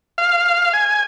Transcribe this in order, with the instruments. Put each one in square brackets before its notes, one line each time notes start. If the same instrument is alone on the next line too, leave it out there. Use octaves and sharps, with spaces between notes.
[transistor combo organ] F5
G#5